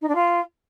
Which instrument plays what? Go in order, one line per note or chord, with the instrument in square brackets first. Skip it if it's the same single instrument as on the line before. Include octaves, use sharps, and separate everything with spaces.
[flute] D#4
D4
F4